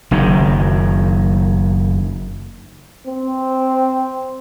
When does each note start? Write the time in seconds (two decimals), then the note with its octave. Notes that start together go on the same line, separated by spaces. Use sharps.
0.11 F#1 F#2 D#3
3.07 C4